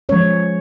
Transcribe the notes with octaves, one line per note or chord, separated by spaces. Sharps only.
F3 G#3 C#4 C#5